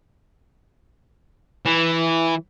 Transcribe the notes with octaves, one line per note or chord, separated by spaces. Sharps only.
E3